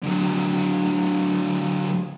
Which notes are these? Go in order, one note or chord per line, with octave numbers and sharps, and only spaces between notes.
D3 F#3